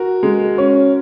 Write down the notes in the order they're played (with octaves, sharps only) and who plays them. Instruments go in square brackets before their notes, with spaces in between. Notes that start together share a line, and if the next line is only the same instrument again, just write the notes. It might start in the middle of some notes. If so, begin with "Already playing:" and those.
Already playing: [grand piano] F#4 A#4
[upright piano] G#3
C#4